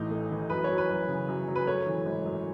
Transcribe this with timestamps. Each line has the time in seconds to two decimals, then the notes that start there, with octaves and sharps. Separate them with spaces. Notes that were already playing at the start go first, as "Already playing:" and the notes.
Already playing: A1 A2 E3 A3 D#4
0.11 A3
0.31 E3
0.50 F#2 B4
0.64 F#3 C#5
0.78 B4
0.89 F#2
1.08 C#3
1.28 F#2
1.48 F#3
1.56 B4
1.67 A3 C#5
1.86 E3
2.05 G#1
2.26 F#2